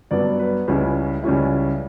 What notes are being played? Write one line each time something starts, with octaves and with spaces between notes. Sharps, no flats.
G2 F#3 B3 D5
B4
C#2 C#3 G3 C#4 E4
C#2 C#3 G3 C#4 E4